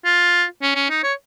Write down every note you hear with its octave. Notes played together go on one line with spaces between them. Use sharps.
F4
C#4
C#4
D#4
C#5